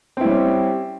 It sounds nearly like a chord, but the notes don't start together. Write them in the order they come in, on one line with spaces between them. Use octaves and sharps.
C4 E4 G3 C#4